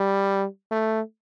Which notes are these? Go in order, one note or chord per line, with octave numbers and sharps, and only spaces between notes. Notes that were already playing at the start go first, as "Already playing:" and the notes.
Already playing: G3
A3